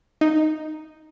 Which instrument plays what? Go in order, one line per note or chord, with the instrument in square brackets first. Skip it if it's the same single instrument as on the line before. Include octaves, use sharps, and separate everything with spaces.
[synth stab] D#4